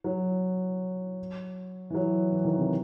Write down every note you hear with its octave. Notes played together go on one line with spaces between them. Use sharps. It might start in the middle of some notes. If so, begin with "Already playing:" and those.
F#3
E3
F#3
E3
D#3
C3